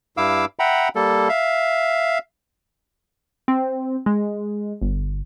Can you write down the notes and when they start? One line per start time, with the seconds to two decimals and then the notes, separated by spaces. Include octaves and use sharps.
0.17 G2 E4 F5 D6 E6
0.59 E5 F#5 G5 A#5 B5
0.96 G3 A#3 A4
1.29 E5 F5
3.48 C4
4.06 G#3
4.81 G1